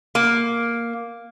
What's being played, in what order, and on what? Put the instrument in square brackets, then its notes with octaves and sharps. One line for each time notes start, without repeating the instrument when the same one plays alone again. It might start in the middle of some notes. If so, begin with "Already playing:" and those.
[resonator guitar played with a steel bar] A#3